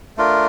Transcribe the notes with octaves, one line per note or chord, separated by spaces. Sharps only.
A3 D4 F4 A#4